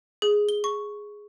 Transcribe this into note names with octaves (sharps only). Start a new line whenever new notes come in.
G#4
G7
C#6